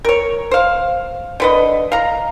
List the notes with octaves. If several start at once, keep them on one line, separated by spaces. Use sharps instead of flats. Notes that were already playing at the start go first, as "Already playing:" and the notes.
A#4 C#5
C5 F5
D3 B4 D#5
F5 A#5